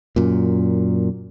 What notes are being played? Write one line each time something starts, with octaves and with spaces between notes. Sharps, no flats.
F#2 A#2